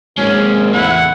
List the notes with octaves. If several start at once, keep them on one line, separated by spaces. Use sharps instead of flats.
G#1 G#3 A#3 C#4
E2 A3 E4 F#5